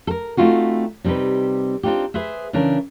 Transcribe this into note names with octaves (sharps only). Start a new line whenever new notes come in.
A4 A#4
A3 C4 D#4 F4 F#4
C3 G3 C4 D#4 B4
C4 D4 D#4 F4 G4
G#4 B4 C5 E5
C#3 E3 D4 A#4